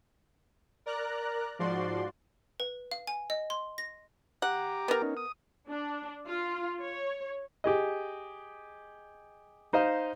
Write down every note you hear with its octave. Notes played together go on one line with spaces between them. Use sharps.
A#4 D5 A#5 F#6
G#2 F3 F#4 D5 C6
B4
F5
G#5
D#5
C6
A#6
G4 F#5 A#5 D6
B3 A#4
C#4 D#4
D#6
D4
F4
C#5
G4 G#4 D#5
D#4 C5 D#5 F5